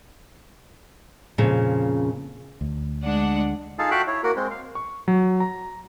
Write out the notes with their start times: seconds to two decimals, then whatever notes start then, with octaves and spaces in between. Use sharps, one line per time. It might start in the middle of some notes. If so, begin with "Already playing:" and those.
1.38 F2 A#2 C#3
2.61 D2
3.03 G#3 D4 F#5
3.79 D#4 F4 G#4 A4 F5 A5
3.91 F#4 A4 E5 F5 G5 F#6
4.07 E4 C#5
4.23 A#3 F#4 A#4
4.36 G#3 C4
4.51 F5
4.75 C#6
5.08 F#3
5.40 A#5